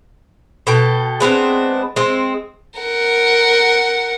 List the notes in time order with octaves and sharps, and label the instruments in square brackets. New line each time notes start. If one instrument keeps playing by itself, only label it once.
[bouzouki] B2 A4 G5
G#3 B3 C4 D4
G#3 C4
[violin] A#4 F#5